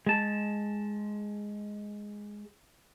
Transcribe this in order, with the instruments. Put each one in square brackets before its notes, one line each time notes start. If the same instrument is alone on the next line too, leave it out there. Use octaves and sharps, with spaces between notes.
[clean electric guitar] G#3 A5